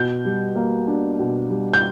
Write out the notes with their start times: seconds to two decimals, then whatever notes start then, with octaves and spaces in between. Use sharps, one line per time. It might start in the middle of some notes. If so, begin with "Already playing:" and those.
Already playing: B2 G6
0.25 G3
0.56 A#3
0.88 D4
1.19 B2
1.50 G3
1.73 G6